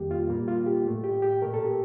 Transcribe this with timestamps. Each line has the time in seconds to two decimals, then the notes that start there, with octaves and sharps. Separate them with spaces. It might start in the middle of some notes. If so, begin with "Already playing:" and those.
Already playing: F2 D#3 G3 A#3 G4
0.11 F4
0.29 A#2 G3 A#3
0.48 F4
0.66 G4
0.85 A2 A3
1.04 G4
1.22 G4
1.42 A#2 A3 A#4
1.54 A4
1.64 G4